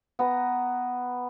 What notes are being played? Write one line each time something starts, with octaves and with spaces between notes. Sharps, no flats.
B3 A#5